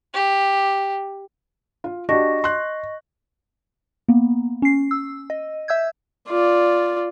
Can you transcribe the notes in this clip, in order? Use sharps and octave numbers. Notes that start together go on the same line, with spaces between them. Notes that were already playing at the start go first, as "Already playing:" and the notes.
G4
F4
D4 F#4 G4 D#5 C#6 A#6
C6 F#6
A#3 B3
C#4 C7
E6
D#5
E5 E6 G6 G#6
F4 D5